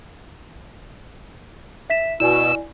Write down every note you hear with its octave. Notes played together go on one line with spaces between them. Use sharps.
E5 B6 E7
B2 E4 D5 G#5 E6